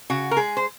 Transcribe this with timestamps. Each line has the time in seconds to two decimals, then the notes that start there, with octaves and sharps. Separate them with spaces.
0.10 C#3 F#4
0.31 A#4
0.37 G#3 G#4
0.57 C5